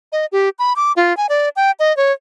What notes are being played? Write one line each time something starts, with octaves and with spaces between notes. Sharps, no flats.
D#5
G4
B5
D6
F4
G#5
D5
G5
D#5
C#5